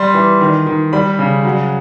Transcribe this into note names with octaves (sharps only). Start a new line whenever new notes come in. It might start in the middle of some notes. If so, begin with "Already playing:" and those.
Already playing: G3 C6
E3
D#3
D#3
G3 B5
C#3
F#3